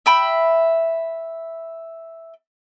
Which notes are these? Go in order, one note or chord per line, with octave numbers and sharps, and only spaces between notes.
E5 G5 B5